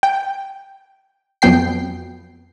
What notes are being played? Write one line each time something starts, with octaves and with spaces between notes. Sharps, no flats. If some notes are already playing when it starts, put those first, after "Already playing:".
G5
F2 F#3 B3 G5 C7